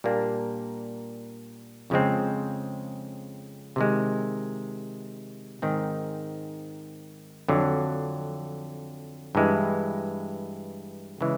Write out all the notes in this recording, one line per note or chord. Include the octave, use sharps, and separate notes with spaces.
A#2 G3 A#3 D4
F2 C#3 F3 G#3 C4
C3 D#3 G#3
G#2 D#3 G#3 C4
F2 D3 F#3
G2 E3 G#3
C#3 E3 G#3